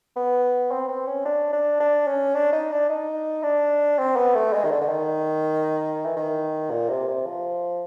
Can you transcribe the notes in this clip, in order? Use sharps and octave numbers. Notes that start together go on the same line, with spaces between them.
B3
C4
C4
C#4
D4
D4
D4
C#4
D4
D#4
D4
D#4
D4
C4
B3
A3
G#3
D#3
D3
D3
D#3
E3
D#3
A#2
C3
C3
F3